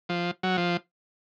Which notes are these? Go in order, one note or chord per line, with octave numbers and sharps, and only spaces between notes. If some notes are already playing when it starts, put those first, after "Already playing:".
F3
F#3
F3